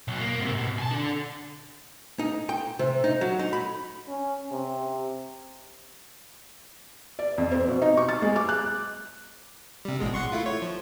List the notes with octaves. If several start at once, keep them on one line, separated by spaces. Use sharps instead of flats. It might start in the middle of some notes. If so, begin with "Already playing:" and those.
B1 B2
A#3
G#2 C3
B2
G#5 A5
D4 A4
D#4
G5
C3
D#4
F#3
D#4
B5
C#4
C3
D5
F2
C4
B2
D#4
C#6
A6
G#3
D6
F#6
C3 G3
A1 B2 G#3
F#5 C6 C#6
A3 E4 F4
C#5
F3